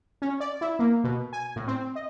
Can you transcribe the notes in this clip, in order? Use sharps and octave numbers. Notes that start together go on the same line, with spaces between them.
C#4
D5
E4
A#3
B2
G#5
A2
C4
D#5